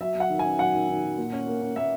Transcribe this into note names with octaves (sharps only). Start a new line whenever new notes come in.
F#3 E5
F#3
F#5
D#3
G#5
C#4
F#3 F#5
D#3
D#3
F#3
A#2
C#4
A#3
C#4
A#3 E5